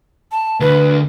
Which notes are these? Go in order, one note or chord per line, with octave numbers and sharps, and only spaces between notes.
A5
D2 D3 B4